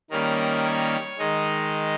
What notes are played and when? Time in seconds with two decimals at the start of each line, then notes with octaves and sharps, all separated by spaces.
0.10 D#3 G3 A#3 C#4 A#4
0.65 C#5
1.19 D#3 G#3 D#4 D#5